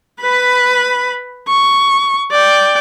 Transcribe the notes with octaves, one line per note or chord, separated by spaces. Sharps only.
B4 B5
C#6
D5 G5